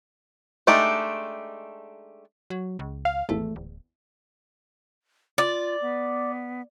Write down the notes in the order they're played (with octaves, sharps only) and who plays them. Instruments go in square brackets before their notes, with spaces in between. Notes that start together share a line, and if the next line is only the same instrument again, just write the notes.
[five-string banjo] G#3 A3 D4 D#4 G4
[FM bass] F#3
C#2
[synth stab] F5
[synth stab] G#1 E2 [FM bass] A3
[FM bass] D1
[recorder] F4 [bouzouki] D5
[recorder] B3